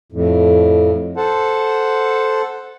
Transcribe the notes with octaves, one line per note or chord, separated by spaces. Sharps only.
F2 A2
A4 C5 F#5 A5